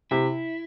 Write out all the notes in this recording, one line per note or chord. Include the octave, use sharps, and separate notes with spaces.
C3 E4